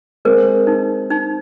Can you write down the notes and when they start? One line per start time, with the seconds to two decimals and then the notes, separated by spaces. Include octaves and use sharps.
0.25 G#3 C4 A#4
0.67 D#4
1.10 D#4